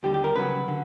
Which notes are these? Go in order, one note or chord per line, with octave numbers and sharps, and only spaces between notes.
D#2 D3 G3 G4
G4
A#4
C#2 C#3 F#3 B4
D3